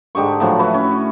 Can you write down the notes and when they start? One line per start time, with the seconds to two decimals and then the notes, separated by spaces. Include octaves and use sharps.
0.15 G#2 D3 G4 C#6
0.40 A2 D3 F3 F#3
0.59 E4 F#4 B4
0.74 C#4